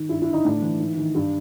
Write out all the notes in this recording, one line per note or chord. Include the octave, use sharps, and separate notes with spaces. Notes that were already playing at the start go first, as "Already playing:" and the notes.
Already playing: D#3
G2 E4
E4
D3
D#4
A2 D4
E3
G#2
D#3
G2